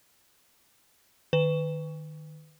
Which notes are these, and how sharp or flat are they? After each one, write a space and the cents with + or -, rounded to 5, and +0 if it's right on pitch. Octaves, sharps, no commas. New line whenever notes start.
D#3 -20 B4 +20